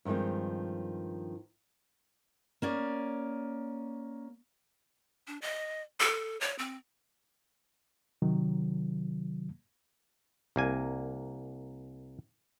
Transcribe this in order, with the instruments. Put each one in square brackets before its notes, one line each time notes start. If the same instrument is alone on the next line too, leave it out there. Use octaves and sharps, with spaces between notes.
[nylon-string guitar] G2 D#3 F3 G#3 C4
[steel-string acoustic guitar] A#3 C#4 D5
[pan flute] D4
D#5
A4
C#5
C4
[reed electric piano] C3 D#3 F#3
[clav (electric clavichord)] C2 A#3 G#5